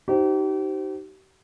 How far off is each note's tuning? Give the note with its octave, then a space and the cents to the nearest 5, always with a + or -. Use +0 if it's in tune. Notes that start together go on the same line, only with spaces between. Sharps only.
D#4 +0 G4 -40 C5 +0